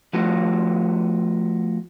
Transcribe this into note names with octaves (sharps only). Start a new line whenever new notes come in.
F3 A3 B3 F4 F#4